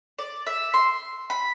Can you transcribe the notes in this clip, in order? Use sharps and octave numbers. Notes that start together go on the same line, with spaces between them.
D5
E5
C6
B5